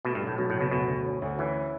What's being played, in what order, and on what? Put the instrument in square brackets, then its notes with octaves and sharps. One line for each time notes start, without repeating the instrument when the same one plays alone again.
[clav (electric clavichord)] B2 [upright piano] A3
[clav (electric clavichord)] G2
[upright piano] B1
[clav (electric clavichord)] A2
[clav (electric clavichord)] B2 [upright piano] F#3
[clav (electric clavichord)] A2
[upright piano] F#1
[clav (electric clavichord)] B2
[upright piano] D2 [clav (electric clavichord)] B2
[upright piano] D2
C#4
D2
[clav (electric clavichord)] E3 [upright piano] C#4